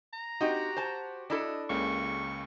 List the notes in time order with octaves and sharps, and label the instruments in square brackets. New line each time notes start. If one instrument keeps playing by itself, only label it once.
[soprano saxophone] A#5
[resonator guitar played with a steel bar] C4 D#4 [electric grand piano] F#4 G4
[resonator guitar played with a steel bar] C5 A5
[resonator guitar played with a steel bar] D4 E4 A4 [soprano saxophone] D#5
[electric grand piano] C#2 C#3 A#3 [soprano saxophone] C#6